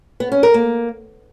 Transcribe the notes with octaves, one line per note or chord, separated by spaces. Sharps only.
B3
C#4
A#4
A#3